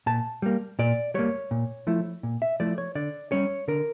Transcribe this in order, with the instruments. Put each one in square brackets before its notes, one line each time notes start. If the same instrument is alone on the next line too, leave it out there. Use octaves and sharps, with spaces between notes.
[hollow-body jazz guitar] A#2 A5
G3 A#3
A#2 D5
G3 A#3 C#5
A#2
F3 A3 E4
A#2
E5
F3 A3 E4 D5
C#5
D3 D5
G3 C#4 C#5
D3 A#4